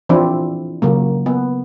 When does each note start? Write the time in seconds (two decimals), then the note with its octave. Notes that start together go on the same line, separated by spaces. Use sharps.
0.09 E3 F3 C4 D4 E4
0.82 C#3 F#3 A#3
1.26 B3